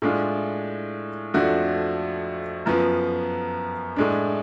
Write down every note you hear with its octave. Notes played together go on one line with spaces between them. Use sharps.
A2 G#3 D4 F4
F2 F3 A3 D4 F#4
F#2 F3 B3
A2 G#3 D4